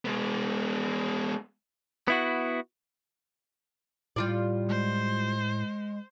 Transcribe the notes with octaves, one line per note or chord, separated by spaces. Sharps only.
G#3 B3
B3 E4 F#4
A2 G3 F4 D5
G#3 C5